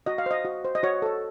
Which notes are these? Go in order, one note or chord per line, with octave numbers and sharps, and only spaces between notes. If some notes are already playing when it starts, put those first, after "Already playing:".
F#4 D#5
F5
C5 D#5
F#4
C5
D#5
F#4 C#5
A4 C#5